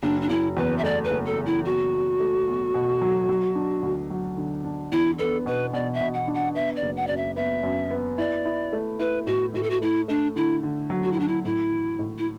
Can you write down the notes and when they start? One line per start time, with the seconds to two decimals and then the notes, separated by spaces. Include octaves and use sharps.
0.02 F#1 D4
0.21 D4
0.29 F#1 E4
0.57 E2 B4
0.78 E5
0.84 A3 D5
1.04 B4
1.11 F#1
1.25 A4
1.38 F#1
1.46 E4
1.65 B1 F#4
1.93 B1
2.20 A3
2.47 B1
2.74 B2
3.01 F#3
3.29 F#3
3.55 D4
3.83 D2
4.10 F#3
4.37 D3
4.64 D4
4.92 E2 E4
5.18 B3 A4
5.46 B2 B4
5.73 B2 D5
5.94 E5
6.01 B2
6.14 F#5
6.28 D4
6.34 F#5
6.55 B3 E5
6.76 D5
6.82 F#1
6.96 F#5
7.07 F#2 D5
7.17 E5
7.36 B3 E5
7.63 F#2
7.91 B3
8.18 E4 D5
8.45 E4
8.73 A3
8.99 E4 B4
9.27 A2 F#4
9.54 A2 F#4
9.63 A4
9.70 F#4
9.81 A3 E4
10.08 A3 D4
10.36 D3 E4
10.63 D3
10.90 F#3
11.03 F#4
11.12 E4
11.17 F#3 D4
11.28 E4
11.44 A2 E4
11.72 E3
11.99 A2
12.18 E4